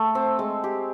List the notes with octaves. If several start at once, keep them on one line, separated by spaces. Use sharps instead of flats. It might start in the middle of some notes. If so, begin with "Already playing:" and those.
Already playing: A3 A4
C4
G#3
G4